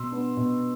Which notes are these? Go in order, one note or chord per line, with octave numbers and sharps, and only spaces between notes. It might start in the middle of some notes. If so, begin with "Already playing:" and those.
Already playing: B2 C6 E6
B3 D4
B2